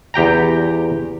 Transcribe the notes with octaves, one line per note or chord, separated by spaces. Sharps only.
E2 G4 G5 A#5